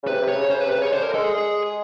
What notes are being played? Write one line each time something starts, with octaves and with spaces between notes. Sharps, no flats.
C#3
C3 B4
C3
C#5
C#3
C#3 C5
B4
C3
B4
C#3 C#5
D3 C5
A#4
G#3 A4
G#4
G#3